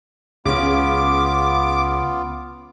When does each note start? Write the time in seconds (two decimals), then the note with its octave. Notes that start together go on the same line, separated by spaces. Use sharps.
0.45 C#2 C#3 B3 C#4 F4 D6